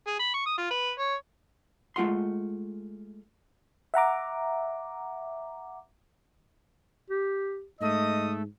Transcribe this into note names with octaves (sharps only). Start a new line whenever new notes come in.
G#4
B5
C#6
D#6
F4
B4
C#5
G#3 A3 F4 F#5 C6
E5 F#5 A#5 D6
G4
G#2 A3 D#5 D#6